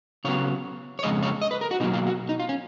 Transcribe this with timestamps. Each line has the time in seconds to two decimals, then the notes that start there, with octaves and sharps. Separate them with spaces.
0.24 C#3 F#3 B3 C#5
0.99 C#5
1.03 F2 C#3 G#3 D#5
1.23 C#5
1.42 D#5
1.51 B4
1.61 A#4
1.71 F#4
1.80 B2 F#3 A#3 D#4
1.94 F4
2.07 F#4
2.29 D#4
2.40 F4
2.49 C#4